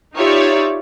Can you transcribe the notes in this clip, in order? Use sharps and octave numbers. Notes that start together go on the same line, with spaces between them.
D#4 F4 G4 C#5 D5 E5